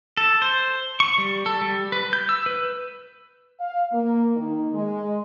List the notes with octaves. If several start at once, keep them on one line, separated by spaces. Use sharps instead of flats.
A4
C5
C#6
G3
A4
G3
B4
G6
E6
B4
F5
A#3
D#3
G#3